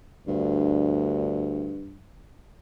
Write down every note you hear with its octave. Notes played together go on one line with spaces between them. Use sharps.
D2 G2